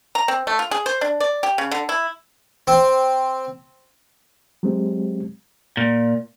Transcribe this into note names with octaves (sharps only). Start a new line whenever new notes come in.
A#5
C4
A3
F4
G#4
C5
D4
D5
G4
C#3
D3
E4
C4
F#3 G#3 C4 G4
A#2